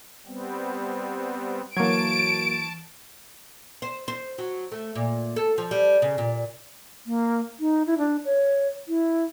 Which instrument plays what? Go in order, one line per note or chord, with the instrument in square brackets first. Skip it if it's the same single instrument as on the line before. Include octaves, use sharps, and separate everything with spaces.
[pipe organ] G3 B3 C4
[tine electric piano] E3 C#6 G#6 [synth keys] F#3 A#3 [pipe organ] A5 [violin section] D7
[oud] C5
C5
F#3
A3
A#2
A4
F3
G3
C#3
A#2
[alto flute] A#3
D#4
E4
D4
C#5
E4